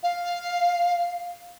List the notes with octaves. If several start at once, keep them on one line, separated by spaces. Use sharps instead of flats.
F5